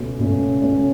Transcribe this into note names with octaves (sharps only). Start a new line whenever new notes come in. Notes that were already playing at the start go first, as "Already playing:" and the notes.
Already playing: C#2 B2 A3 C#4
C#2 B2 A3 C#4
C#2 B2 A3 C#4